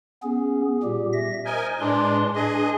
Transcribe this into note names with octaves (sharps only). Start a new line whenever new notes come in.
B3 C#4 G#4
A#2 G3 G4
E5 A#6
A#4 C5 D#5 G#5
A2 G#3 D4 B4 C6
D4 G#4 B4 D#5